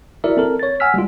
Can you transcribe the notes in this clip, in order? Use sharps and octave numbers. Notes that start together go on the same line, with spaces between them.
E4 F#4 A#4 D5 E5
C4 A4 A#4
C#5 A6
F#5 G#5 E6 F6 B6
G3 G#3 F4